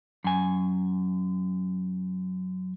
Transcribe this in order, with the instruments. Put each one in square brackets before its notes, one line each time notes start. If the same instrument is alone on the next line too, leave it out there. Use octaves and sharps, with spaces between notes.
[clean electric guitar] F#2 G#5